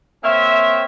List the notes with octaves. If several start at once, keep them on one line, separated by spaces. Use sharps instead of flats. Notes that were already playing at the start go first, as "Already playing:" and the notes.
A#3 C4 C#5 E5